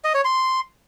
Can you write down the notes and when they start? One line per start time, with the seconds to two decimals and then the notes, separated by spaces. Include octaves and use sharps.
0.04 D#5
0.14 C#5
0.25 C6